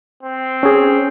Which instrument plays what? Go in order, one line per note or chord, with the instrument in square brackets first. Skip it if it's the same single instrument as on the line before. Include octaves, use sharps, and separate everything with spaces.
[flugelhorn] C4
[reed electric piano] C#4 G#4